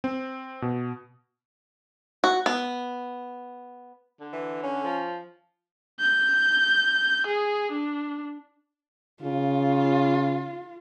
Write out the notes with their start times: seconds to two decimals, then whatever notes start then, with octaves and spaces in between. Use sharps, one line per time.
0.04 C4
0.62 B2
2.24 F#4
2.46 B3
4.20 D3
4.33 E3
4.63 C#4
4.84 F3
6.00 G6
7.27 G#4
7.72 D4
9.22 C#3 F4